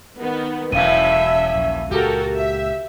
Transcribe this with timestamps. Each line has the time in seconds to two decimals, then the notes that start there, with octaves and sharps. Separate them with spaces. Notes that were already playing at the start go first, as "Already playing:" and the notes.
0.17 D#3 B3
0.72 E1 F#2 A2 E3 E5 F5 D#7
1.55 A#1 D#2
1.91 C#2 A#2 F#4 G4 A4 A#4
2.35 E5